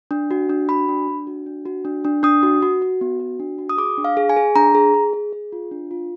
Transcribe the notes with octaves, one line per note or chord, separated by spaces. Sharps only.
D4
F#4
D4
F#4 B5
D4
D4
F#4
D4
F#4
D4
D4
D4 D#6
F#4
F#4
F#4
B3
F#4
D4
F#4
D#6
G#4 D6
D4
F5
G#4
G#5
G#4
D4 A#5
G#4
G#4
G#4
G#4
F4
D4
F4